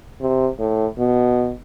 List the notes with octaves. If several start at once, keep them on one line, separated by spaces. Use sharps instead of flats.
C3
A2
B2